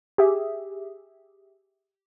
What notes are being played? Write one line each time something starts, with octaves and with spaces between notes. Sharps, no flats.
G4 G#4 E5